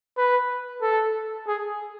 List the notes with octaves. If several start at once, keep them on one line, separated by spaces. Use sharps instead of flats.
B4
A4
G#4